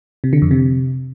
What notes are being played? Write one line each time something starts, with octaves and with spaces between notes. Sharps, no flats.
C3
D3
F2
C3